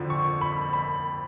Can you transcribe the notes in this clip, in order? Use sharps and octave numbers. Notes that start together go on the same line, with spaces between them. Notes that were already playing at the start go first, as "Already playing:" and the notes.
Already playing: F2 D3 F3
C#6
B5
B5